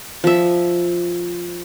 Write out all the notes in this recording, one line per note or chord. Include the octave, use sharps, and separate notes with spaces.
F3 E5